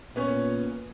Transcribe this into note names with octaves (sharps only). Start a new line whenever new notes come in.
A#2 B3 C#4 C#5